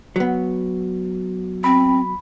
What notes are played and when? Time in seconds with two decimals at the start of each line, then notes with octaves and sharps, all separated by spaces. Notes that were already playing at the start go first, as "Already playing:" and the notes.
0.16 F#3 B3
1.64 C4 B5